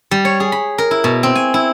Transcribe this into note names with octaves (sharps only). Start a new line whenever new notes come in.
G3
C#5
G#4
B5
A#4
E4
B2
C4
G#5
E4